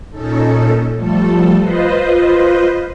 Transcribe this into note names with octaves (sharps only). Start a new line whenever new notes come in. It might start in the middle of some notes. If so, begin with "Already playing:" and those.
A#2 C#4 D#4 A4
F3 G3 A3 A4
F4 B4 C5 D#5